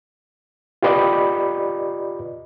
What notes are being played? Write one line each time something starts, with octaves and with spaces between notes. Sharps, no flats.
F4 G4 B4 D5 D#5 B5